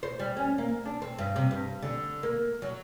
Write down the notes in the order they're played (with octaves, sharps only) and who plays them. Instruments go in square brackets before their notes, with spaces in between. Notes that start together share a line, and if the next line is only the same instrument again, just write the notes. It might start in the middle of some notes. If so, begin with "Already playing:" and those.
[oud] C5
G3
C#4
A#3
D4
C4
G2
C3
G2
D3
A#3
F#3